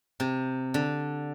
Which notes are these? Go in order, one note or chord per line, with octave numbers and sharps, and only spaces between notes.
C3
D3